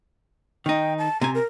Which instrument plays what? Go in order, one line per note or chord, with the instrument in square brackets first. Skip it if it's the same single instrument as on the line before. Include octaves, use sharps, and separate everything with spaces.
[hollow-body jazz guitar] D#3 D#4 [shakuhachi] G5
[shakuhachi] A5
[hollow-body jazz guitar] C3 C4 G#5 [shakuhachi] A#5
[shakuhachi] A#4